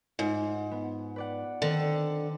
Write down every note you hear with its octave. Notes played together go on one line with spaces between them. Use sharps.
G#2 F4
B3
B4 D5 F#5
D3 D#3 C4